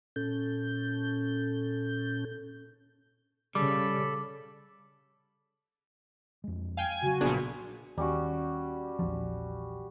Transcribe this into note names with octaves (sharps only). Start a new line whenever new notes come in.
A#2 C#4 A4 G6
C#3 G3 A4 B5 D6
F2 G#3
F5 G5 G#5
C#3 F#3 F#4
A#1 A#2 B3 D4 G#4
D#2 G3 C#4 F#4
A#1 E2 F3